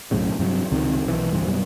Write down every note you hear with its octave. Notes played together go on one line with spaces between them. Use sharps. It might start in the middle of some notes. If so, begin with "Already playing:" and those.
B1 F#2 A2 C#3
G2 C3 D#3 F#3
C#2 C3 D#3
B1 E3
G1 C2 G2 E3
F#2 B2 G3 B3